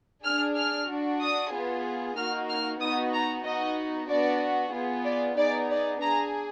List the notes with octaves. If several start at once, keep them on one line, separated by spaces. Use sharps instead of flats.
D4 G#4 F6
F6
D4 F#4
D#6
B3 F4 G#4
A#3 D#4 F#4 F6
F6
B3 D#4 F#4 D#6
A#5
B3 D#4 F#4 D#5
B3 D4 F#4 D5
B3 F4 G#4
D5
B3 D#4 G#4 D5
D5
D4 G#4 A#5